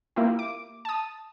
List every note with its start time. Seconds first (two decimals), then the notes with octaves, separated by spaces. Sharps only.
0.16 A#3 E4 F4 G4
0.39 D6
0.85 A5 D#6